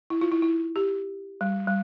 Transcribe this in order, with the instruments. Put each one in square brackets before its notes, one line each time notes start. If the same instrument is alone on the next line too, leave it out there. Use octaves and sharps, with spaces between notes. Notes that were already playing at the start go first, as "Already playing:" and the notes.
[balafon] E4
F4
E4
E4
G4
G3
G3